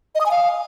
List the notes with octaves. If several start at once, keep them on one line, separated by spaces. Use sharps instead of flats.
D#5
D#6
G#5
F5